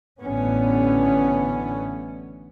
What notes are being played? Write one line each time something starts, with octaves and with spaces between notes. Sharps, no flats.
A1 A2 D3 B3 C#4